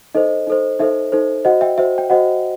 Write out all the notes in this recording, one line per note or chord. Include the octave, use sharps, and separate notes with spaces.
D#4 A4 C5 D#5
D#4 A4 C5
D#4 A4 C5 E5
D#4 A4 C5
F#4 C5 D#5 F#5
E5 G5
F#4 C5 E5
G5
F#4 C5 D#5 F#5